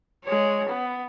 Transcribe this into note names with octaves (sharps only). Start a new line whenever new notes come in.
G#3 C#5
B3